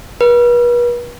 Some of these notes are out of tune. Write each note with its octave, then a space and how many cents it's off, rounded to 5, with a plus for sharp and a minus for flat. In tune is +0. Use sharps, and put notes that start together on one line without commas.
B4 -40